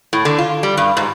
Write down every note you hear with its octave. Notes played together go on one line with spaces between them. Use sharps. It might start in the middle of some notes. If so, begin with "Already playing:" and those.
A2
D3
F4
G3
G2
G#2